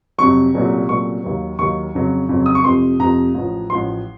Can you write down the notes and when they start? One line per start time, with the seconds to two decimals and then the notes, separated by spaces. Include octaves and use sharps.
0.18 F2 C3 F#3 C#6
0.54 C2 A#2 F#3 A3 C#4
0.89 C2 A#2 F#3 A3 C#4 C#6
1.24 D#2 D#3 F#3
1.58 D#2 D#3 F#3 C#6
1.95 F2 C#3 F#3
2.29 F2 C#3 F#3
2.46 D#6
2.55 C#6
2.64 F2 C3 F3 A3 C6
2.99 F2 C3 F3 A3 A#5
3.34 A1 A2 F3
3.70 A1 A2 F3 C6